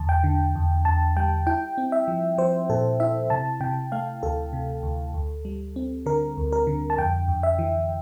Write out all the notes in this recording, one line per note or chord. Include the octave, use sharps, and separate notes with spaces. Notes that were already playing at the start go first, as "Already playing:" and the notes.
Already playing: E2 D3 A5
G5
D3
E2
E2 A5
G3 G5
E4 G5
C4
E5
F3
F3 C5
A#2 A4
E4 E5
C3 A5
C3 G5
A3 F5
D2 A4
C3
D2
D2
G3
C4
D3 A#4
D2
A#4
D3
A5
F2 G5
F2
E5
E3